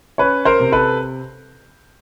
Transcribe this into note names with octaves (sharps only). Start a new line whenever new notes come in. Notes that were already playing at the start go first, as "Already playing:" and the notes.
C#4 B4 C#5
A#4 C5
C3
A4 B4